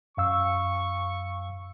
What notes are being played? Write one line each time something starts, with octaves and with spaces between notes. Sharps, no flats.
F#2 F5 C#6 E6